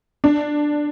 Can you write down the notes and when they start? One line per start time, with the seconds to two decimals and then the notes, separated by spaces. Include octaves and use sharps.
0.24 D4